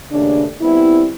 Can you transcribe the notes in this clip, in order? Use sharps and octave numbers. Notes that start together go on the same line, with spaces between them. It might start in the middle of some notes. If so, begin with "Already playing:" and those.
D#2 C#3 A3 D4
G3 B3 C4 E4